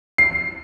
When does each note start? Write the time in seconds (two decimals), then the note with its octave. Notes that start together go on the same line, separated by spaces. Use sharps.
0.18 C7